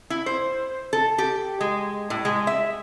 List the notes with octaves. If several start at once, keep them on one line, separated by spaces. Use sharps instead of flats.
E4
C5
A4
G4
G#3
A2
G#3
E5